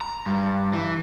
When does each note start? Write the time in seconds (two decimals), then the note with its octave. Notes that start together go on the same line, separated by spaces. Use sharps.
0.01 A#5
0.26 G2
0.73 E3